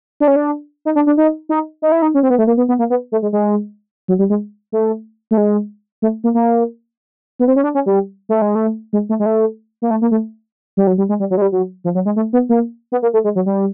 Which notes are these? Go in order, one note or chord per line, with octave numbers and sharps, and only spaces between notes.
D4
C#4
D4
D#4
D4
D4
D#4
D#4
D#4
E4
D#4
C#4
C4
B3
A3
A#3
B3
B3
A#3
B3
A3
G#3
G#3
F#3
G3
G#3
A3
A3
G#3
A3
A#3
A#3
B3
C4
C#4
D4
C#4
G3
A3
G#3
A3
G#3
A3
G#3
A3
A#3
A3
A#3
A3
G3
F#3
G3
G#3
G3
F#3
G#3
G3
F#3
F3
F#3
G#3
A3
B3
A#3
B3
A#3
A3
G#3
F#3
G3